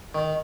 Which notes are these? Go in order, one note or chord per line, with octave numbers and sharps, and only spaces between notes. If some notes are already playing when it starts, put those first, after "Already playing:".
D#3